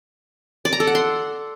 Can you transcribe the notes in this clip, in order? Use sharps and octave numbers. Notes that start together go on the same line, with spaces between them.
D5
A#5
A4
F#5
C6